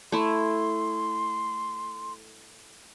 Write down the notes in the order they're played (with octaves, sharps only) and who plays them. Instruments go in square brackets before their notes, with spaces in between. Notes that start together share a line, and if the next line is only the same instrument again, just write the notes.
[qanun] A3 E4 [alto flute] C6